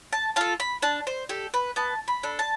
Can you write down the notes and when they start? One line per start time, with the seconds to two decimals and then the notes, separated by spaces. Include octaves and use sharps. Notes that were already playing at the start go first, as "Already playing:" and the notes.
0.13 A5
0.36 F4 A4 A5
0.60 B5
0.82 D4 A5
1.07 C5
1.29 G4 A4
1.54 B4
1.76 B3 A5
2.08 B5
2.23 D4 A4
2.39 A5